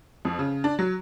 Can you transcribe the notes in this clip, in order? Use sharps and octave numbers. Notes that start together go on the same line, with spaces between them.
F2
C#3
D4
F#3